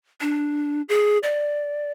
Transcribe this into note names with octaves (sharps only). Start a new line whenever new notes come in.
D4
G#4
D5